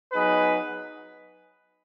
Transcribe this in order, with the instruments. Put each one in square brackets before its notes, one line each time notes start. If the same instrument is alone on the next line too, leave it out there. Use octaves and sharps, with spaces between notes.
[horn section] F#3 B3 D#4 G#4 B4